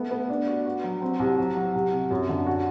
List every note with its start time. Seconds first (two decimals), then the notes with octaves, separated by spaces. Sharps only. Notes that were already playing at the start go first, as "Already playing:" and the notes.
Already playing: A3 B3
0.11 B3
0.30 D4
0.47 F#4
0.66 F#4
0.84 F#3
1.02 C4
1.20 C2
1.38 F#3
1.57 F#3
1.75 C2
1.93 C3
2.11 F#2
2.29 D3
2.46 F#4